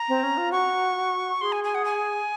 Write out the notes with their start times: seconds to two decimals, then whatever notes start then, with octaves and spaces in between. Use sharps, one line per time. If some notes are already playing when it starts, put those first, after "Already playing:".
Already playing: A#5
0.09 C4
0.23 C#4
0.37 F4
0.52 F#4 C#6
1.41 G#4 C6
1.52 G#5
1.64 G#5
1.75 F#5
1.85 G#5